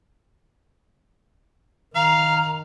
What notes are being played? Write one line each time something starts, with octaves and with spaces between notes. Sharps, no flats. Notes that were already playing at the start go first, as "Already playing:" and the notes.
D#3 F5 A#5